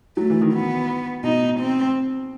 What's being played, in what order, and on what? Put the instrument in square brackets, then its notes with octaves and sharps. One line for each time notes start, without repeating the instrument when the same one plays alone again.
[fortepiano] F#3 [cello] A3
[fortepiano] E3
D#3
[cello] B3
[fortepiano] B2 [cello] D#4
[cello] C4